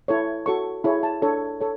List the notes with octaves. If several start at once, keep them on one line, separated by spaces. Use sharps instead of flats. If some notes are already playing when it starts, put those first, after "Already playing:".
E4 A4 C#5
F#4 A4 C#5 C#6
E4 G#4 C#5
A5
D4 A4 C#5
A4 C#5